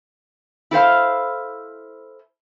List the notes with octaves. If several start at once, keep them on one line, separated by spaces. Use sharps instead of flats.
E4 A4 C5 F5